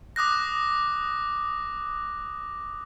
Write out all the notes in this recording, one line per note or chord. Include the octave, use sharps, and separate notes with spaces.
D6 D#6 F#6 A#6